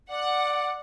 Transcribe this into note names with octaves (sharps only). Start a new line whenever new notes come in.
D5 F#5